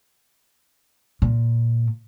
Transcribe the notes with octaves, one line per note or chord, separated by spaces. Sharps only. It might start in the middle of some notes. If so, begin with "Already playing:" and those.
A#2